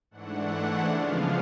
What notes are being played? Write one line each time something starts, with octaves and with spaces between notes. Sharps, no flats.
G#2 E3 A3 D4 F#5
C#3 F3 G#3 B3 D4 F5